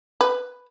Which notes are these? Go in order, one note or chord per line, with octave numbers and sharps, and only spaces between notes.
B4